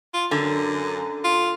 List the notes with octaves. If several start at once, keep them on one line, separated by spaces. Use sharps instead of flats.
F4
F#2 D3
F4